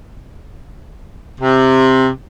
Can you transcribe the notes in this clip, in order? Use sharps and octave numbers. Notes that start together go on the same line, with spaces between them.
C3